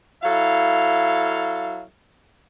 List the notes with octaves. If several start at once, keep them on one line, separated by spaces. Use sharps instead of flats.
F#3 E4 A4 F5